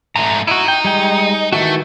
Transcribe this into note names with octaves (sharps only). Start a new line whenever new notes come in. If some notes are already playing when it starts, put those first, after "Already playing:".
G#2 A3 A#5
D#4 E4 F#4
G5
G3 G#3 G5
D#3 E3 A3 F#4